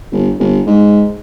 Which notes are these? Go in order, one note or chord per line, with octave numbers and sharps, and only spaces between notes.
G1
G1
G#2